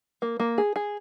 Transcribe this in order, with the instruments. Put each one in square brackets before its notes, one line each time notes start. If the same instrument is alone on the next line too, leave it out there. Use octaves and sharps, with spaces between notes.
[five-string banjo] A#3
A#3
G#4
G#4